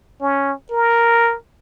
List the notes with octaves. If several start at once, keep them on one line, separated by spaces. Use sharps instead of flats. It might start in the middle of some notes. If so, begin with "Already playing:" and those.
C#4
A#4